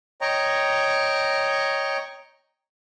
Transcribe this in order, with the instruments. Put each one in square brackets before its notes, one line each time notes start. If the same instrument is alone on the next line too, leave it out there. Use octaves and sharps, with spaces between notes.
[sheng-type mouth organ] C#5 D#5 G5 A#5